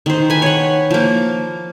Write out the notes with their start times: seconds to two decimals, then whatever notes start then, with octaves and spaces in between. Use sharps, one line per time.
0.06 D#3 C5
0.30 B4 G#5
0.42 C#5 F#5
0.91 F3 A#3